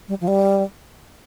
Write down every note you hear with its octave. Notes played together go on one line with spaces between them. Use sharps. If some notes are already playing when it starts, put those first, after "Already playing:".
G3
F3
G3